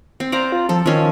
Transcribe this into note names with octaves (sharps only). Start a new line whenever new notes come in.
C4
C5 D5 F5 A#5
F4
F3 A4
D#3 F3 C#4